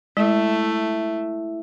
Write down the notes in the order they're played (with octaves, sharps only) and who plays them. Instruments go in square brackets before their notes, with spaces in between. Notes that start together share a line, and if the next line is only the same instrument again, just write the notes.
[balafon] G#3 [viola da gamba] A3 [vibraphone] E4 E5